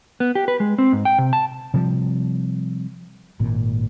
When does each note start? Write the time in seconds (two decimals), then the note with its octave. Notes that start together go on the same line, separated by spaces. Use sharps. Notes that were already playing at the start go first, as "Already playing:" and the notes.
0.20 B3
0.35 G4
0.48 B4
0.60 G#3
0.78 C4
0.93 G#2
1.05 G5
1.18 C3
1.33 A5
1.74 C3 F3 G3
3.40 G#1 A#2